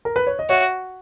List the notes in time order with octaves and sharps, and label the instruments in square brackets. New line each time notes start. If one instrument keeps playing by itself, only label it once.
[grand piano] A#4
B4
C#5
D#5
[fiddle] F#4 [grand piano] C#5 E5